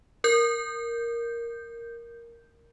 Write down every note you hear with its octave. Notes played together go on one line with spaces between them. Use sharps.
A#4 G6